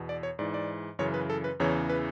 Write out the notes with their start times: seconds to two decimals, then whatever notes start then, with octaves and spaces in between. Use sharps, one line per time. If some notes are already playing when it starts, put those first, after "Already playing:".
Already playing: E2 B2
0.09 D5
0.23 C#5
0.39 G#2 E3 D5
0.54 D5
0.99 F#2 C#3 E3 C#5
1.14 B4
1.30 A4
1.44 B4
1.60 E2 C#3 E3 C#5
1.90 B4